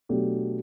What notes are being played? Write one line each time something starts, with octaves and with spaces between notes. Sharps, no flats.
B2 F#3 A3 D4 G4